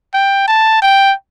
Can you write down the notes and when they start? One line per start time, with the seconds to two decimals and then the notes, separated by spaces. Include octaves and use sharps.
0.14 G5
0.47 A5
0.82 G5